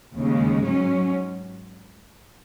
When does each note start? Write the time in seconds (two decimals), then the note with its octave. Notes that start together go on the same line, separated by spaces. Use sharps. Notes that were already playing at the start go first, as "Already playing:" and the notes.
0.15 D#2 C#3 G#3
0.64 G#2 F#3 C#4